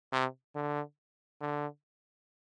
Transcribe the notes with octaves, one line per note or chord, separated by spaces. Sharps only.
C3
D3
D3